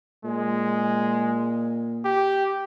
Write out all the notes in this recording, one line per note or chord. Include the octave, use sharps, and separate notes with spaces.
A#2 G#3
G4